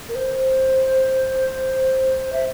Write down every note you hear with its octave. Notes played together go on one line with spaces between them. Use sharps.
A#4
C5
E5